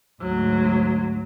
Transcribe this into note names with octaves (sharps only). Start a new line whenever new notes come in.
D2 G#2 F#3